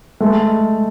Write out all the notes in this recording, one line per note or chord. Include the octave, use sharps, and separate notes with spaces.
G#3 A3